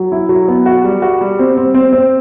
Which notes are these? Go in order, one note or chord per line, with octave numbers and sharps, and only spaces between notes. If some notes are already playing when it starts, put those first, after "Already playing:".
Already playing: F#3
E4
F#3
B3
F#4
G3
F#4
G3
C4
C4
C4
C4